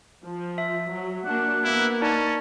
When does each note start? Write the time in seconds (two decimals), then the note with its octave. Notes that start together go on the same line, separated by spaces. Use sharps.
0.24 F3
0.58 E5
0.91 F#3
1.25 A#3 D4 F#4 F#5
1.64 A#3 B3 E4
2.02 C#4 D#4 D5 A5